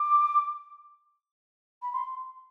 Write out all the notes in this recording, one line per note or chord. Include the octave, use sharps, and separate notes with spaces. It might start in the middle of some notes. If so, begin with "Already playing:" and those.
Already playing: D6
B5
C6